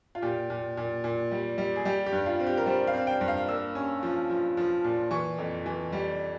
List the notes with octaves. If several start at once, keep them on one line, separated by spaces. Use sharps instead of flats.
F4
A#2 G4
A#2
A#2
A#2
G3
G3
G#4
G3 G4
G4
G2
F4
C4
G4
A#4
G3 C5
F5
C4
G5
G2
F5
A#3 E6
C#4
F3
F3
F3
A#2
E3 C#6
F2
E3
G3